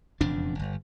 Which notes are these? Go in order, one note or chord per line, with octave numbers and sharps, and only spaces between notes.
E1 F2 C#3 D4
G1